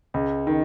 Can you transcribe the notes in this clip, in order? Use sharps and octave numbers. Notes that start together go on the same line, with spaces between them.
C#2
D#3